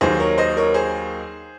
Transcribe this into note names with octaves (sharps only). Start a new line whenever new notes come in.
D#2 D#3 F#3 G#4 C5
A#4 C#5
C5 D#5
A#4 C#5
G#4 C5